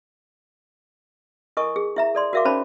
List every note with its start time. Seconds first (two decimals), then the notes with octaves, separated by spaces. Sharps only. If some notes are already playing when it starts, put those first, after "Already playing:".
1.57 E4 A4 A#4 D#5 G#5 C#6
1.76 G#4
1.96 E4 E5 A#5
2.15 A4 D5 C6
2.33 F#4 A#4 E5 F5 D6
2.45 C#4 D#4 C5 C#5 A5 B5